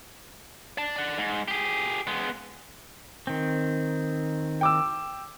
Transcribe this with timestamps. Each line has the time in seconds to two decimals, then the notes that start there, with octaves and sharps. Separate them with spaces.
0.78 D5 A5
0.96 D5 F#5
1.18 G#2
1.48 G4 G#4
2.07 G#3 B3
3.27 D#3 C4
4.61 G5 D6 E6